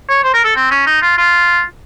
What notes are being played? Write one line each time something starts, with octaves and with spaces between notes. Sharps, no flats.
C#5
C5
A#4
A4
C4
C#4
D#4
F4
F4